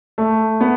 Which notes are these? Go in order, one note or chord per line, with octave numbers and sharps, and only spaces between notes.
A3
B3